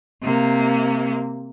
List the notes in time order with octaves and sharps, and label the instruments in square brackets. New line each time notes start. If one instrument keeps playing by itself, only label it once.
[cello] C3 A#3